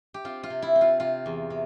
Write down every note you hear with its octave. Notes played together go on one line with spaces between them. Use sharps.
G4
C4 F4
F4
C3
E4
C4
F4
C3 F4
E2
C3